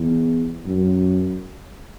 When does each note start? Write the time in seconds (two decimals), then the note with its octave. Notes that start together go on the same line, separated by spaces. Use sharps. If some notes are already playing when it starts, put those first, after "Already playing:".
Already playing: E2
0.66 F#2